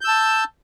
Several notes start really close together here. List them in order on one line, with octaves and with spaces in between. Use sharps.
G6 E6 A5